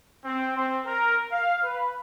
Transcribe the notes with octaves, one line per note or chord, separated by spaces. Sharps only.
C4
C4
A#4
F5
B4